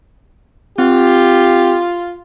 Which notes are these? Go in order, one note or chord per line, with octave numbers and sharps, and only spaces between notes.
C4 F4 G4